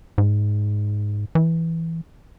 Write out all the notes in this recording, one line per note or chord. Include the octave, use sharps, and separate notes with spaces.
G#2
E3